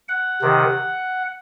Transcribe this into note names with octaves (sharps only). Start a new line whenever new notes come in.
F#5
C3 D#3